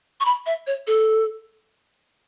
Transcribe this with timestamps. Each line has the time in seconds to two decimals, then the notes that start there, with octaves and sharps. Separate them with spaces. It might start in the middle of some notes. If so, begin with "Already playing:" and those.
0.20 C#6
0.26 B5
0.46 E5
0.67 C#5
0.87 A4